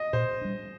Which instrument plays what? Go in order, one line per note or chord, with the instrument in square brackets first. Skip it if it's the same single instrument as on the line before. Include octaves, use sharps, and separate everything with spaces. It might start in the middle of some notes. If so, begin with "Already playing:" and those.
Already playing: [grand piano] D#5
[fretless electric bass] A#2 [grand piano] C5
[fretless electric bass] G3 D4